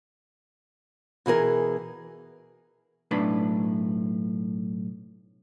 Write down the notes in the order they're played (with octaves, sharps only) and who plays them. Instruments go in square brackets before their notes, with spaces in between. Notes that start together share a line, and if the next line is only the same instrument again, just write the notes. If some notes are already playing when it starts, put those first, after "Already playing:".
[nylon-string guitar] B2 E3 G#4 A#4
[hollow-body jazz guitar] B1 A2 D4 B4